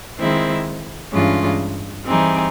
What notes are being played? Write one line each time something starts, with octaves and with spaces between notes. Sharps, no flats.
D#3 G#3 C4 E4
G2 E3 G#3 C#4 F4
E3 G3 C4 D#4 G#4